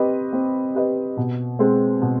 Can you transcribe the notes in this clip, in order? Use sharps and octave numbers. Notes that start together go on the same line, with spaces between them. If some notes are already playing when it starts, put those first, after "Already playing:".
Already playing: C4 G4 B4 D#5
C4
G4 B4 D#5
B2
G#3 C4
B2